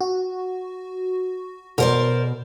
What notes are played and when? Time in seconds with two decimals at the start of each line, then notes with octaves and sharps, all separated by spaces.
0.01 F#4
1.78 B2 A#4 C5 D5